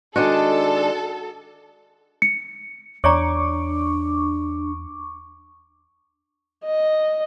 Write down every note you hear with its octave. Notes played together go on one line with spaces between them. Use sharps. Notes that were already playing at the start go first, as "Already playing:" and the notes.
D#3 G#3 D4 F#4 A4
C#7
E2 D4 C#5 D5 A#5 C#6 D6
D#5